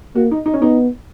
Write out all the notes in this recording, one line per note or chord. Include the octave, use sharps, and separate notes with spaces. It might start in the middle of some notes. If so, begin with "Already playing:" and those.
A#3 F#4
D#4
D#4
C#4
B3 D#4